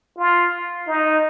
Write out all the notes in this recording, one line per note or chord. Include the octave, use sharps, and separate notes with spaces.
F4
D#4